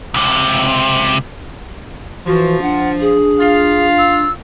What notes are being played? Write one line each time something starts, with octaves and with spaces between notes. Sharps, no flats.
C#2 C3
E3 F3 F#4
D4 F#5
G#4
F4 F5
E6